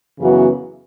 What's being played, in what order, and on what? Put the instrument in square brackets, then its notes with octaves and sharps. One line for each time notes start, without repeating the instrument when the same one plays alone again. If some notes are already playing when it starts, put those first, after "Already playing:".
[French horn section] F#2 C#3 E3 B3 F#4